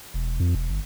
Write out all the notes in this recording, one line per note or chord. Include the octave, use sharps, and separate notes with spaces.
E1
F2
E1
G1